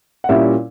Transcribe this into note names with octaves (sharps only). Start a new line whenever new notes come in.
F#5
A#2 G3 C#4 E4 E5